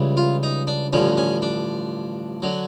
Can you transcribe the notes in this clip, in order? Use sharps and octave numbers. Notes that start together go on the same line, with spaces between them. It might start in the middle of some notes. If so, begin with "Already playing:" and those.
Already playing: C#2 C#3 E3 G3
F4
D#4
D4
A1 G2 D3 F3 C#4
C#4
D4
D3 F#3